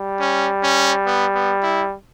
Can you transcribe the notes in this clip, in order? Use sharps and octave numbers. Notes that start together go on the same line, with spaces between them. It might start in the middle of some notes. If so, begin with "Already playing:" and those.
Already playing: G3
C#4
C#4
B3
B3
E4